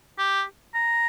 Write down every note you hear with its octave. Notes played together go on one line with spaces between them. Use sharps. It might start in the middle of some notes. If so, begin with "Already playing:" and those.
G4
A#5